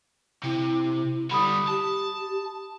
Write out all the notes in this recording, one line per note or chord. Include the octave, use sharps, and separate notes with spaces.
C3 E4
D3 G3 B5 D#6
G4 A5